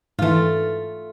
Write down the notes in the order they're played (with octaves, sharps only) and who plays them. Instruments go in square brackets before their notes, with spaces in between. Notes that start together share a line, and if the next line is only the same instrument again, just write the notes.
[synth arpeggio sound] G#2 E3 [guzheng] A3 F4